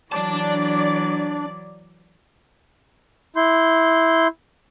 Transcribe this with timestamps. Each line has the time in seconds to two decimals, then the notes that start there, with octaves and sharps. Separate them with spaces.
0.12 E3 F#3 D4 D5 A5
3.36 E4 C6 G6